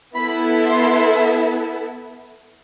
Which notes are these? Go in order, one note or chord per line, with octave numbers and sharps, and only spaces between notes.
B3 E4 A4 B5
C6